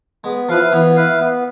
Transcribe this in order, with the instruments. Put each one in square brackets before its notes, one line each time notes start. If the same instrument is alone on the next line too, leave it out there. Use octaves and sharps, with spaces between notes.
[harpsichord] G#3 [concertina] B3
[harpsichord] F3 [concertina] E4 B4 F5
[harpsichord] E3 [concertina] B3
[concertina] E4 B4 F5
B3